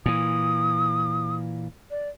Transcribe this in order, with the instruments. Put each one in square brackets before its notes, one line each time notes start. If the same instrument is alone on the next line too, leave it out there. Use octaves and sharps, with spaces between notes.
[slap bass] A#2 E3 [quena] D#6
[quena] D5